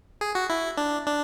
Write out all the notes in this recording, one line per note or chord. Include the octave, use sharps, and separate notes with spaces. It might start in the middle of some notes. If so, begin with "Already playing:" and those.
G#4
F#4
E4
D4
D4